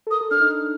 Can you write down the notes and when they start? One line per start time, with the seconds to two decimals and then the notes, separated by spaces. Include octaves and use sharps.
0.07 A4
0.11 A#4 D#6
0.21 A4
0.31 D4 F6
0.41 D#4